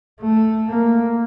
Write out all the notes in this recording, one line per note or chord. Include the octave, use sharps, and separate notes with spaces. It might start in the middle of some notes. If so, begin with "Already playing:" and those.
A3
A#3